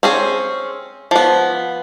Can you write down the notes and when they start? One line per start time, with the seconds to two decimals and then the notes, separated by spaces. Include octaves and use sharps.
0.03 C4 C#4 G#4
1.11 F3 B3